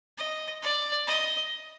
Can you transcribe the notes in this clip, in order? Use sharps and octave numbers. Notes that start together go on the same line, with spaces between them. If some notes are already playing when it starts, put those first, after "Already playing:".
D#5
D5
D#5